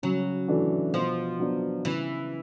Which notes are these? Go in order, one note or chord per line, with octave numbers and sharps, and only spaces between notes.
C#3 F#3
E3 A3 D4 F#4
B2 F3
F#3 B3 D4
C#3 E3